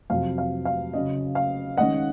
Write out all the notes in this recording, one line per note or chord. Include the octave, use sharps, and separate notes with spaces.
F2 C3 F#3 F5
F5
F5
C#3 F#3 C#4 D#5
F5
D#3 G#3 C#4 D#5 F#5